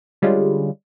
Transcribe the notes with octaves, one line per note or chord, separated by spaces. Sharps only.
D3 G3 G#3 C#4 F4